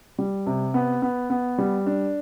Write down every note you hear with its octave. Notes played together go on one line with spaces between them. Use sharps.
G3
C3
B3
B3
B3
G3
D4